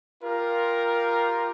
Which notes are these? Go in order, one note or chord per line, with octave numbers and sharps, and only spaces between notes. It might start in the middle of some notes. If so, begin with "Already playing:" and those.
F4 G4 A#4